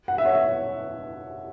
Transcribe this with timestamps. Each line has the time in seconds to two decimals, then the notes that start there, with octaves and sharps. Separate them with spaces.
0.08 F#5
0.18 E5
0.25 C#5